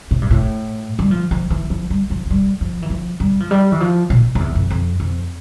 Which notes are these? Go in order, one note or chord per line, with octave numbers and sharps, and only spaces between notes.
A2
G2
A2
G3
F3
F3
E3
F3
G3
F3
F3
G3
F3
E3
F3
G3
F3
G3
E3
F3
A#2
F2
E2
F2
F2
F2